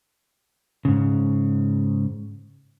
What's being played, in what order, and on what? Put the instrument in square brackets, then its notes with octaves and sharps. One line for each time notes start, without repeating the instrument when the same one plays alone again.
[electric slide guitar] G#2 C#3